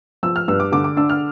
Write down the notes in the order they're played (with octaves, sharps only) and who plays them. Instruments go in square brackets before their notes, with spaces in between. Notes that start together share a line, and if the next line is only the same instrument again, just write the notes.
[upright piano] F3 E6
F6
G2 E6
D6
D3 D6
D6
D4 E6
F6